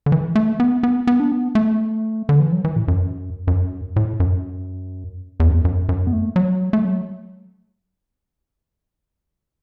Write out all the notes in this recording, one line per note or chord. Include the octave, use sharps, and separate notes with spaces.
D3
E3
A3
B3
B3
B3
D4
B3
A3
D3
E3
F#3
E3
A2
F#2
F#2
A2
F#2
E2
F#2
E2
F#2
F#2
B3
A3
F#3
A3
F#3